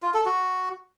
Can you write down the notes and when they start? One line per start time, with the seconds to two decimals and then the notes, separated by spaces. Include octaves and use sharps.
0.02 F4
0.14 A4
0.25 F#4